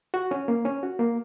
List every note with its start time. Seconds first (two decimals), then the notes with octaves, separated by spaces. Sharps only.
0.14 F#4
0.31 C#4
0.48 A#3
0.65 C#4
0.83 F#4
0.99 A#3